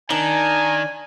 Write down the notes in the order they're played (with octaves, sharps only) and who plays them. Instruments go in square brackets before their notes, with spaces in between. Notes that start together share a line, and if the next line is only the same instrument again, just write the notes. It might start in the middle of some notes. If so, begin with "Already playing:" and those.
[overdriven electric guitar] D#3 [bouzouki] D4 [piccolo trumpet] G#5 [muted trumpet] A#5